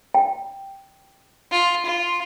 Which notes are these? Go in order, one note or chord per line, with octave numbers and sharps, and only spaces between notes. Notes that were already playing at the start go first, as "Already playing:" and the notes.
G5
F4
F4